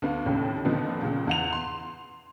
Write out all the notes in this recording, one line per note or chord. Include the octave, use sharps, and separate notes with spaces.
D2 B3 F5
F1 D#2 A2 C#3
A#2 D3 F3 B3 C4 D#4
C#2 A#2 C#3
E2 F#5 F7
C6